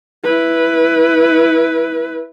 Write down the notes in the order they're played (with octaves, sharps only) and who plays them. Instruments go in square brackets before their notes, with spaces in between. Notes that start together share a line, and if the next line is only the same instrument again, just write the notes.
[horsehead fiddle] E4 B4